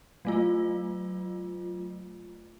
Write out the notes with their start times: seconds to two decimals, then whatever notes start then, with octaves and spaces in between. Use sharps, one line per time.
0.25 F#3 A3 F4